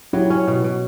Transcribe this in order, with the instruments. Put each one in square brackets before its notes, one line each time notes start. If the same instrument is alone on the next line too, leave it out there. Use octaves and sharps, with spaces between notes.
[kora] F#3 [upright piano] E4 G4
[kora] C#4
B2
B2